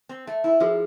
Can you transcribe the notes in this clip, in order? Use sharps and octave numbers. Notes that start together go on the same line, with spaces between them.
C4
A3
E4
F3 F#4 G#4